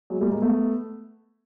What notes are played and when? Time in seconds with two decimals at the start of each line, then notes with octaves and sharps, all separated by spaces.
0.10 F#3 G#3
0.21 G3 A3
0.31 G#3 A#3
0.42 A3 B3